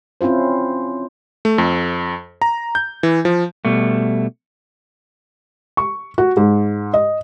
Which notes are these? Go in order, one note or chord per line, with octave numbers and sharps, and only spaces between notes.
C4 C#4 E4 F4 C5
A3
F2
A#5
G6
E3
F3
B2 G3 A3
C#6
F#4
G#2
D#5